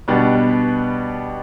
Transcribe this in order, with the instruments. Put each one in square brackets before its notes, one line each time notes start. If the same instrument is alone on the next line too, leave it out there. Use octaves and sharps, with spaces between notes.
[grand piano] B2 G3 B3 D4